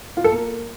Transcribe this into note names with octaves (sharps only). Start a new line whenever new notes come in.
F4
A4
A#3